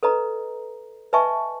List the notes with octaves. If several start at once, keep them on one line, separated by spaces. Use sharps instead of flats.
A4 B4 D#5 A#5
B4 D#5 E5 G#5 A5 C#6